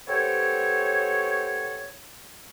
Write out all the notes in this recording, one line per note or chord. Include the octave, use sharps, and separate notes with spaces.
B3 G4 A4 C5 C#5